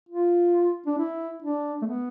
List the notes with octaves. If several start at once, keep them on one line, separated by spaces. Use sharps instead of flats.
F4
D4
E4
D4
A3
B3